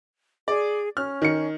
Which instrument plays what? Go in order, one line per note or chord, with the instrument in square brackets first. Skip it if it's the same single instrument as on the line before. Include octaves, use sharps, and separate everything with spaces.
[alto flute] G#4 [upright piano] D5
[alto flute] C#4 [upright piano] F6
[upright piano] D#3 C#7